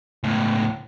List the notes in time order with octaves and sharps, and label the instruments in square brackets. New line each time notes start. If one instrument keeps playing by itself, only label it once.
[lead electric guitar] C#2 A2